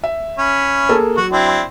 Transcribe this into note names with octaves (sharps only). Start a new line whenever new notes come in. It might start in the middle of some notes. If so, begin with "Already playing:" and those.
E5
C#4 B5
A#3 G#4 A4
F#3 F#4
C4 D4 E4